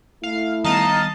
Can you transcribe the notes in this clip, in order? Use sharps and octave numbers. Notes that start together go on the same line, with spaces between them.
A3 E4 F5
D#3 G3 B3 D#4 D#5 F5 A5